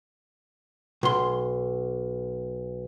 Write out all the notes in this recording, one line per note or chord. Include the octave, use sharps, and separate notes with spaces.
B1 C6